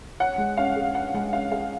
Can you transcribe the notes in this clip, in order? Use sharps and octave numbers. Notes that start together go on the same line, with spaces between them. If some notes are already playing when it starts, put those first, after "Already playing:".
C#5 F#5
G#3
C#4 F5
G#4
C#5 F#5
G#3 F#5
C#4 F5
G#4 F5